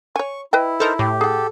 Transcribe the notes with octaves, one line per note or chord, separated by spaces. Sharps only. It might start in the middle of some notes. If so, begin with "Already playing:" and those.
C#5 G#5 C#6
E4 B4 D#5 G5
D#4 A4 A#4 C5
A2 G4
G#4 A4 F#5